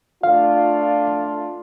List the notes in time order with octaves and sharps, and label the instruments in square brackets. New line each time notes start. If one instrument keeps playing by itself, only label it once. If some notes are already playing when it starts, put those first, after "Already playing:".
[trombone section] A3 D4 F4 [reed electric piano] F5